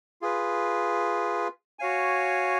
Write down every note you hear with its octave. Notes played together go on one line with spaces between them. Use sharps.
F4 G#4 B4
F#4 C#5 F5 G#5